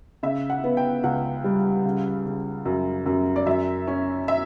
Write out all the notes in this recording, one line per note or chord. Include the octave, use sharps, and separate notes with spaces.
C#3 E5
F#5
B3
G5
C#2 F#5
G3
C#3
C#3
F#2
F#2
D5
F#2 E5
C#4
E5